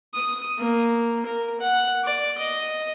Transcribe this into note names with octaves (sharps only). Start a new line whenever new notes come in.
D#6
A#3
A#4
F#5
D5
D#5